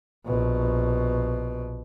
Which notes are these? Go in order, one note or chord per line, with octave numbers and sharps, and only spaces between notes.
A#1 B2